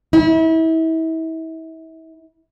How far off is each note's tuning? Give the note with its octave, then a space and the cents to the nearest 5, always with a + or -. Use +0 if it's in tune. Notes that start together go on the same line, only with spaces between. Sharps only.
E4 -35